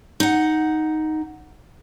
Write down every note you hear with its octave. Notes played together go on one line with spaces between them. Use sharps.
D#4 F#5